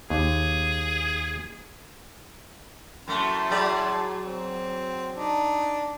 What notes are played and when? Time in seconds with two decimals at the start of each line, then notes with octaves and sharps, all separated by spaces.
0.10 D#2 G#4
3.08 F#2 A3 E4 A5 C6
3.51 F#3 G#4 D5
4.23 C4
5.14 D4 D#4